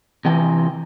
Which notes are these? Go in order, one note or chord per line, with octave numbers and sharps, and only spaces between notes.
C3 E3 G5